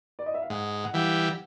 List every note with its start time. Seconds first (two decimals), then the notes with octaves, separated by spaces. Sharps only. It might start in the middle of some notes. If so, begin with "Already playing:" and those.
0.19 D5
0.26 D#5
0.34 E5
0.42 F5
0.50 G#2 F#5
0.84 F#5
0.94 E3 G3 F5